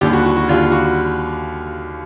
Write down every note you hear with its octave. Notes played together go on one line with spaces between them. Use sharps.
D#2 D3 G3 G4
F#4
F#4
F#4
D#2 D3 G3 F4
F#4